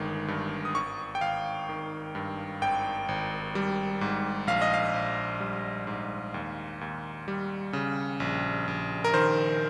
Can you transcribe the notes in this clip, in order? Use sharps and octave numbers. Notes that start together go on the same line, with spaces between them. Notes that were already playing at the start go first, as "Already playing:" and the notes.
Already playing: G1 D#3 G#3
G2
D#6
G#1 C#6
G5
G#1 F5
D#3
G2
G#1 G5
G#1
G3
G#2
A#1 F5
D#5
F5
A#1
G3
G#2
D#2
D#2
G3
C#3
A#1
A#1
A#4
D#3 C5